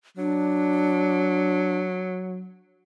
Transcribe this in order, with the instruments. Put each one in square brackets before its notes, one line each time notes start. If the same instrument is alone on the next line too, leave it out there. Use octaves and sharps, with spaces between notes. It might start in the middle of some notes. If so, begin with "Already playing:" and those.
[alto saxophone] F#3 [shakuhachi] D4